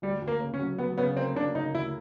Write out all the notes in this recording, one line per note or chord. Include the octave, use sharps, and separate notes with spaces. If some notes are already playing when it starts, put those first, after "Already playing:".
D2 G3
D2
A#3
C#3
C#4
F#3
F#3 B3
C#3 B3
A#3 C4
C#3 D4
C#3 D#4
D2 E4